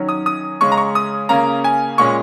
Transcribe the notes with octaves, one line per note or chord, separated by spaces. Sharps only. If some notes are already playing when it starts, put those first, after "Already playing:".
Already playing: D#3 F#3 C#4
D#6
D#6
C#3 G#3 C#4 C#6
A#5
C#6
D#6
C#3 A#3 C#4 A#5
G#5
A#2 G#3 C#4 C#6